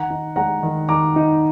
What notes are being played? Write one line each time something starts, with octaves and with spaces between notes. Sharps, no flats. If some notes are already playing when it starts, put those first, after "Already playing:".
Already playing: D#3 F#5 A#5
D#4
G#3 F#5 A#5
D#3
D#3 A#5 D6
D#4